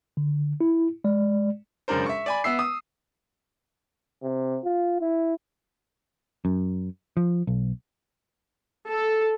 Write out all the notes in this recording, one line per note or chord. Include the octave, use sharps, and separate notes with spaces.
D3
E4
G#3 D5
E1 F#2 C#3 D4 A#4 C5
E5 C#6
D5 G#5 B5
B3 E5 E6 C7
D#6
C3
F4
E4
F#2
F3
B1
A4